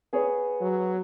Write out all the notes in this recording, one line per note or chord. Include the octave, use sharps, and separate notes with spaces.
B3 G#4 C#5
F#3